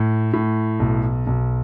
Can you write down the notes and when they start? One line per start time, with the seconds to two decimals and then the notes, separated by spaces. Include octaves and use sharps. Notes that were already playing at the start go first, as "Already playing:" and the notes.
Already playing: A2
0.33 A2
0.80 B1
1.27 B1